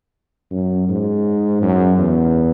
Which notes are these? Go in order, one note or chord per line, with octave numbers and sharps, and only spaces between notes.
F#2
G#2
F#2
E2